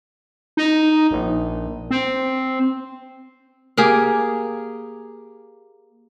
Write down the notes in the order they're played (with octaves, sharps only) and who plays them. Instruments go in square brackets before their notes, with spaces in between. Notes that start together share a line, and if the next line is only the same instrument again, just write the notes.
[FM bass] D#4
A#1
C4
[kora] A#3 G4 G#4